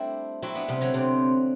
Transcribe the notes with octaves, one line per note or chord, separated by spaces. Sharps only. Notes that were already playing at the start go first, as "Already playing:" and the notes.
Already playing: G3 A3 C4 D4 E4
F#3 C4 E4
B3 D4
C3 G3 B3
D3 F#3
C3